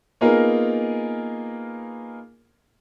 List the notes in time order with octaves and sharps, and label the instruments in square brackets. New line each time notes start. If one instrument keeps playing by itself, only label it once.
[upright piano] A#3 B3 D#4 F4 G#4 A#4